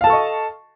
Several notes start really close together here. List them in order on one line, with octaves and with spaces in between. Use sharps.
F5 A5 A4 C#6 D#5